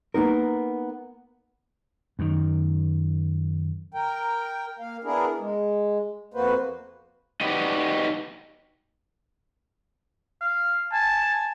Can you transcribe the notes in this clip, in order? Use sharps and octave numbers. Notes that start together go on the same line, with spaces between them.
A#3 B3 D#4 A#4
F#2 D#3
A#4 G5
A#3 F5
B3 D4 E4 G#4 A#4
G#3
F2 A#3 B3 F#4 B4 C5
D#4 F#4 G4 B4 D5 D#5
F5
G#5 A5